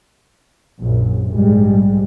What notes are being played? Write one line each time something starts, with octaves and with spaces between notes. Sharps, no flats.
A#1 F#2
A#1 G#2 G3 G#3